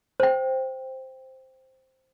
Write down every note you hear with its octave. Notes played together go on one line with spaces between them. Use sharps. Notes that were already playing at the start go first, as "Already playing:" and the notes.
C5 G5